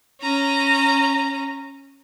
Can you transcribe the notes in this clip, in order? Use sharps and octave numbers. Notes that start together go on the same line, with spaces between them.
C#4 A#5